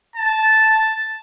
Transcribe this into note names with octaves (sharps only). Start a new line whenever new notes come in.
A5